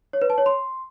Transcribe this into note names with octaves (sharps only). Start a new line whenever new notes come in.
C#5
B4
A5
C#5
C6